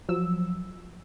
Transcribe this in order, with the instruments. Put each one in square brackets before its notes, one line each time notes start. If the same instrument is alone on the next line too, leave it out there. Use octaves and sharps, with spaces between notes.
[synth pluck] F3 F#3 E6